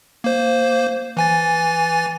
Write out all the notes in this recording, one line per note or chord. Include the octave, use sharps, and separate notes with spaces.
A#3 C5
E3 G#5 A6